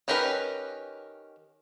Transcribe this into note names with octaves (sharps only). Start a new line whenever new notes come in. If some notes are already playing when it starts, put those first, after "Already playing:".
D#3 C#4 G4 A#4 B4